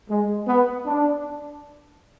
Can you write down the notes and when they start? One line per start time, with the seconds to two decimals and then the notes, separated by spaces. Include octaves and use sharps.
0.10 G#3
0.47 B3
0.86 D4